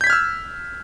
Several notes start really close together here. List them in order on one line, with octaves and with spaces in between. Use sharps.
G6 B6 G#6 F6 E6